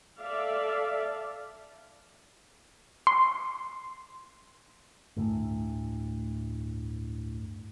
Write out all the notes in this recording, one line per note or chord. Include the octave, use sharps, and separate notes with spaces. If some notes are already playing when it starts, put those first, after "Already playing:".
A4 D5 E5 F5
C6
G1 D2 A2